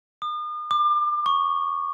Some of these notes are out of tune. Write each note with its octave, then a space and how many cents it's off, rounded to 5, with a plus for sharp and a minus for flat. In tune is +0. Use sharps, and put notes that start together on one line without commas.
D#6 -40
D6 +30
C#6 +5